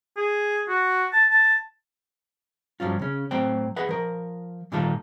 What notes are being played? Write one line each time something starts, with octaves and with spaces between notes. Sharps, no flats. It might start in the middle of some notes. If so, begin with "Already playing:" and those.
G#4
F#4
A5
A5
G2 F3 F#3 C#4 F4
C#3 C#4
A2 F#3 C4 C5 G5
G#4 B4 D#5 F#5
F3 A#4
A#2 D#3 G3 F4 A4